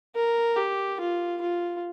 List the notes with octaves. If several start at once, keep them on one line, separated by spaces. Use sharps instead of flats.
A#4
G4
F4
F4